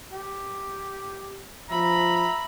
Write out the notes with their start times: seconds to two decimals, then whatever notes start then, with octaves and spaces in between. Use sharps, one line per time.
0.11 G4
1.71 F3 E5 A#5 B5